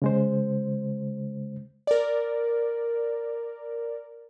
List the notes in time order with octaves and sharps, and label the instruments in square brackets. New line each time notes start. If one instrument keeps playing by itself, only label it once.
[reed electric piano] C#3 G#3 C5
[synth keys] A#4 D5